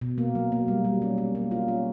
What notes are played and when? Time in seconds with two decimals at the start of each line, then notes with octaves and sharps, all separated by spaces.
0.01 B2
0.18 A#3
0.35 F#3
0.52 A#3
0.68 G3
0.85 G3
1.02 C#4
1.18 C#4
1.35 A#3
1.51 F4
1.68 C#4